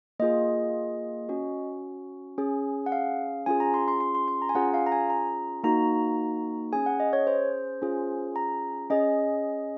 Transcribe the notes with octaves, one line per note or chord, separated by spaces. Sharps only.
A#3 F4 G#4 D#5
C#4 F#4
C#4 G#4
F#5
F5
C#4 F4 G#4 G#5
A#5
C6
C6
C6
C6
C6
A#5
G#5
C#4 F4 G#4 F#5
F5
A#5
G#5
A#5
A#3 D#4 F#4 A#5
C#4 G#4 G#5
F#5
D#5
C#5
C5
C#4 F4 G#4
A#5
C#4 G#4 D#5